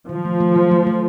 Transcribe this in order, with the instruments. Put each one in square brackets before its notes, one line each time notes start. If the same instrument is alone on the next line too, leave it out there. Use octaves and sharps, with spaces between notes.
[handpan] D#3 [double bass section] F3
[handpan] A3
A3
F#3
A3
A3